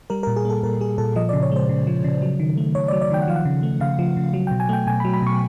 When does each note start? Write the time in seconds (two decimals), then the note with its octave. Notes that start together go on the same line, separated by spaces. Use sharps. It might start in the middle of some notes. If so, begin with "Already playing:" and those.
0.10 G3 A#4
0.23 A#4
0.27 A#2
0.36 G#4
0.45 A#3 A4
0.63 A#2 A#4
0.81 G3 G#4
0.98 A#2 A4
1.16 F3 D#5
1.29 D5
1.33 C#3
1.42 C#5
1.52 G#3 C5
1.69 C#3
1.87 F3
2.04 C#3
2.22 F#3
2.39 D#3
2.58 A3
2.75 D#3 C#5
2.88 D5
2.93 F#3
3.01 D5
3.11 D#3 G5
3.22 F#5
3.28 F3 F5
3.36 F#5
3.45 C#3
3.63 A3
3.80 C#3 F5
3.99 F3
4.17 C#3
4.34 F#3
4.47 G5
4.51 B2
4.60 G#5
4.69 A3 G5
4.87 B2 G#5
5.00 B5
5.04 F#3
5.14 B5
5.22 B2 C#6